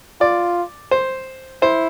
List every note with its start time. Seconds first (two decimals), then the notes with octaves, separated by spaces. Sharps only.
0.20 F4 D5
0.91 C5
1.62 E4 C5